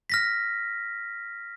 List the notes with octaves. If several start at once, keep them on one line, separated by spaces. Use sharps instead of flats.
F6 A#6 B6